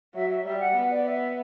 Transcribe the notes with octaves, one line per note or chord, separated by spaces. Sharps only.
F#3 E5
E5
G3 E5
F#5
B3
D5
E5